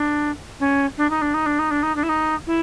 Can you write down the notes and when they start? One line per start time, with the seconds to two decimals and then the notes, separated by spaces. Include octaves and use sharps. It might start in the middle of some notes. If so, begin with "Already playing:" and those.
Already playing: D4
0.60 C#4
0.97 D4
1.10 D#4
1.21 D4
1.34 D#4
1.46 D4
1.59 D#4
1.71 D4
1.83 D#4
1.96 D4
2.03 E4
2.09 D#4
2.47 E4